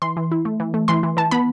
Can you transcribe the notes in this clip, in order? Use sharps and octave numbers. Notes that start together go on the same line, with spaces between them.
E3 C6
E3
E4
A3
E3
A3
E3 C6
E3
E3 A5
B3 B5